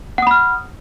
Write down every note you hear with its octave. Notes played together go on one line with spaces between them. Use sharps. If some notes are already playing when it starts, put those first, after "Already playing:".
F#5 B5 D#6 F6